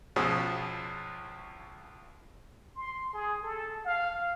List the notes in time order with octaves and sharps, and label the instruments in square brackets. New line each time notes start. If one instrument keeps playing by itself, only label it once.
[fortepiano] C#2 B2 F3 G#3 C#4 D#6
[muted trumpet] C6
G#4
A4
F5